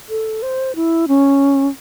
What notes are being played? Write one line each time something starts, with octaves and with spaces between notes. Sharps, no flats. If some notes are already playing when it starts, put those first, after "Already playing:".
A4
C5
E4
C#4